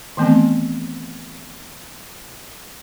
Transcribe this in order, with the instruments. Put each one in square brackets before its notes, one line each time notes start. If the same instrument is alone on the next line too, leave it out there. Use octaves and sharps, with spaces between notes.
[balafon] D#3 E3 A3 B3 C4